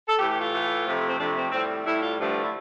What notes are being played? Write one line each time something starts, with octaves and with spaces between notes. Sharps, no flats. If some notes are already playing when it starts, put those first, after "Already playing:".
A4
A2 E3 A3 G4
G4
F4
A2 E3 A3
F2 C3 F3 A3
C4
F2 C3 F3 A3 D4
C4
A2 G3 C4
A2 G3 E4
F4
G2 D3 F3 A3
E4